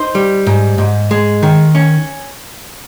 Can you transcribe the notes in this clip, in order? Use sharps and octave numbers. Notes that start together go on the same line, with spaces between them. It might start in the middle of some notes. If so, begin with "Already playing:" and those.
Already playing: D#4 C5
G3
G#2
G#2
G#3
D#3
C#4